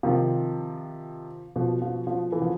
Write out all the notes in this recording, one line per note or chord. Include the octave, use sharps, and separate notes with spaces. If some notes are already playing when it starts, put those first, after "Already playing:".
C3 D#3 F3
B2 F3
F3
F3
E3
F3